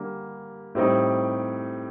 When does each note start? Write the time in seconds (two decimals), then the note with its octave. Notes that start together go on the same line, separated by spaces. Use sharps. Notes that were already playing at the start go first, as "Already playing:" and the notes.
Already playing: D3 G3 A#3
0.75 A2 G3 C4 D#4